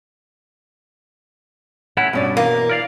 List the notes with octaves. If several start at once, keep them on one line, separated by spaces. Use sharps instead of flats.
A3 C#4 E4 F#5
G2 B2 C#4 D5
E3 A#3
A#4 D5 F5